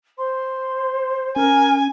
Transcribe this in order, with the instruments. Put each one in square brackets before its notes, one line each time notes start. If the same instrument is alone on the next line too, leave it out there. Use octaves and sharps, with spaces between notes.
[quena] C5 [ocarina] C6
[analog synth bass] C#4 [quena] A#4 [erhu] G#5